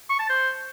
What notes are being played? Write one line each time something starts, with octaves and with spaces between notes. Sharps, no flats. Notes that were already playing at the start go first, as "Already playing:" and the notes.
C#6
A5
C5